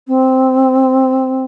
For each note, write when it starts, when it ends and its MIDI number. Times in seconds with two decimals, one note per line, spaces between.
0.07 1.44 60